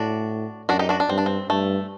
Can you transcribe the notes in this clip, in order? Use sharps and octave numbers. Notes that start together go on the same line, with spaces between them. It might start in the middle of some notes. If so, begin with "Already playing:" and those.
Already playing: A2 D4 F#4
F#2 D4 F#4
D#4 G4
D4 F#4
D4
G2 C4
D4
C4
G2 A3